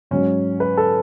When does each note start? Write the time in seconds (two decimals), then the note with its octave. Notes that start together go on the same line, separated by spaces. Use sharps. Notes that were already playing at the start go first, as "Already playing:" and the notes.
0.11 G#2 F#3 C#4
0.60 B4
0.77 A4